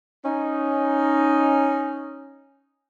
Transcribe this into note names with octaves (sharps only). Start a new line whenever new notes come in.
C#4 D#4